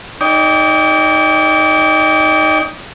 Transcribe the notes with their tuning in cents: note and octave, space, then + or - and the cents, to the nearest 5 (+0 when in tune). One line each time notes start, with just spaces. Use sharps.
D#4 +0 D5 -35 G5 +20